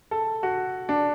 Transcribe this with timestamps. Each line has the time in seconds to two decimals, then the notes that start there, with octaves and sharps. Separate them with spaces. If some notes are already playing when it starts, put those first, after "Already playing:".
0.11 A4
0.43 F#4
0.89 D4